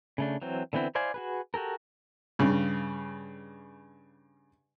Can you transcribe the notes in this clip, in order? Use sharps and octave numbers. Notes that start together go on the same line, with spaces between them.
C#3 A3 D4
E3 F#3 C4
D3 E3 B3 C4 E4
E4 C5 D5 F5 G#5
F#4 G#4 B4
F#4 G4 A4 A#4
G2 C#3